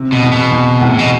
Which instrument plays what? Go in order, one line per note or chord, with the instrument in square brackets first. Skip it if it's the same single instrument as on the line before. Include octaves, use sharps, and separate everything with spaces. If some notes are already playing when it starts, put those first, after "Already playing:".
Already playing: [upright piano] C3
[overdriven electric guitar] B2
[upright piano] E2
[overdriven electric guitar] B2
[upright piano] E2
E2
[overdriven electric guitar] A2
B2